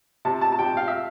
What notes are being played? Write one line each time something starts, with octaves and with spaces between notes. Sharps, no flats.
C3 A5
A5
A5
C3 G5
F5
E5